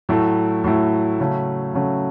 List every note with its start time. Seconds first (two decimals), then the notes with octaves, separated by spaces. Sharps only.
0.09 A2 F#3 A3 E4
0.64 A2 F#3 A3 E4
1.19 C#3 F#3 A3 C#4
1.74 C#3 F#3 A3 C#4